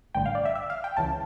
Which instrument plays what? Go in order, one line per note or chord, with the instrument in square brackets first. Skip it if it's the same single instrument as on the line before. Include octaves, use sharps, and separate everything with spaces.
[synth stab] A1 G2 D3 G5
F5
D5
E5
E5
F5
G5
C#2 C#3 E3 A5